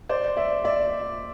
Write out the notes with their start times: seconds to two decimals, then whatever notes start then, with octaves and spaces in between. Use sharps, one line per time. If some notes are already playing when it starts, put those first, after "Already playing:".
0.09 C5 D5
0.37 D5 E5
0.64 D5 E5